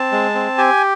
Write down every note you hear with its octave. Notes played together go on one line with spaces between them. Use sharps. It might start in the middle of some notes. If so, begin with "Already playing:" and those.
Already playing: C4 A5
G#3
C4
G4 G#5